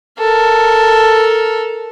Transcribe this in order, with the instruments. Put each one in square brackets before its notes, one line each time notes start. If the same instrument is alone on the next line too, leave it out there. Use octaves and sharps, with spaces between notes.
[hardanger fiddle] A4 A#4